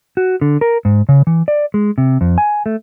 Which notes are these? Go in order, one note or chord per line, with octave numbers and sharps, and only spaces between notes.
F#4
D3
A#4
G#2
C#3
E3
D5
G#3
C3
F2
G#5
A3